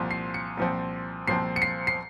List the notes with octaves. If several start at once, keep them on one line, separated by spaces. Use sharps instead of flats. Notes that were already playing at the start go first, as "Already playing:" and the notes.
Already playing: C2 A#2 F3 C4
C7
C#7
C2 A#2 F3 C4
C2 A#2 F3 C4 C7
C#7
C7
C7